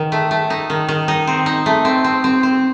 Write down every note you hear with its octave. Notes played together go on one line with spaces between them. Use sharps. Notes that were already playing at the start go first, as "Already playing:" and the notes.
Already playing: D#3
A3
A3
D#4
D#3
D#3
D#4
C4
D#4
A3
C4
C4
C4
C4